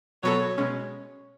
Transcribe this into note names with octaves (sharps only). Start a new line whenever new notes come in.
B2 F#3 B3 F#4 A4 C#5
B2 G#3 C#4